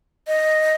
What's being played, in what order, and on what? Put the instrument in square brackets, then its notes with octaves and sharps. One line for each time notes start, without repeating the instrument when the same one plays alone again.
[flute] D#5